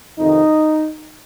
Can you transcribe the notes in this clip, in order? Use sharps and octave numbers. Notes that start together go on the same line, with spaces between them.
F2 C3 D#3 D#4